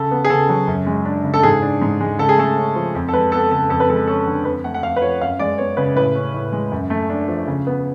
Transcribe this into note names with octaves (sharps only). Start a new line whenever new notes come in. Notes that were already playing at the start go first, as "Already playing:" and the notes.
Already playing: C#3 A4
B3
G#4
C#3 A4
F#3
F#2
G#3
D4
C#3
A4
G#2 G#4
D4
G#2
G#3
C#3 A4
G#4
A3 A4
C#4
F3
F2
A4
G#3 B4
B3 A4
C#3 A4
F2 A4
B4
G#3 A4
C#4 A4
D3
F2 B4
A3 F#5
F#5
F2 F5
B4
F3 C#5
F#2 F5
G#3 D5
B3 C#5
C#3 B4
A2 B4
C#4
A2
G#3
F#2
A3
D4
F3
C#3
B3